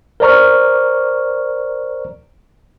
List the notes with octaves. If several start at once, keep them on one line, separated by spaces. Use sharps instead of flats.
A#4 C5 D5 A#5 C#6 F6